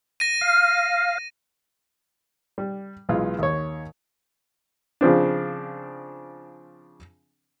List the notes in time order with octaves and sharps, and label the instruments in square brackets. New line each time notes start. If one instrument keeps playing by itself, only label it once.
[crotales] A#6 D#7
[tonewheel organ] F5
[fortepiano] G3
B1 E3 G#3 F4
D#2 C#5
C#3 F3 C4 D4